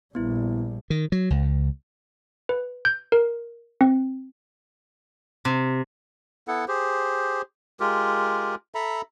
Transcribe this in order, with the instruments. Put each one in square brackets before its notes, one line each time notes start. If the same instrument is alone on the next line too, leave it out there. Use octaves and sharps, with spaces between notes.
[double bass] A#1 G3 [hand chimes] B3 E4
[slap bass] D#3
F#3
C#2
[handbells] B4
G6
A#4
C4
[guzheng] C3
[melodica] B3 E4 A4 F#5
G4 G#4 C5
G#3 F4 G4 A#4
A4 E5 A#5 B5